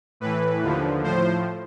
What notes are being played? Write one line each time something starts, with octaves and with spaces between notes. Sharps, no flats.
A2 E3 B4
D#2 D3 F3
A2 F3 C5